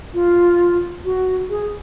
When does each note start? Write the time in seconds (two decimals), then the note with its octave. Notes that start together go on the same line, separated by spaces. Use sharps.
0.14 F4
1.05 F#4
1.50 G#4